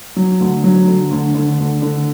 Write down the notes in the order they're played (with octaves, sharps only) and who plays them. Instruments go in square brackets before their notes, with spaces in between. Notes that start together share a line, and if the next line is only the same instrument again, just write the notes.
[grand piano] F#3
D2
F#3
D3
D2
D3
D2
D3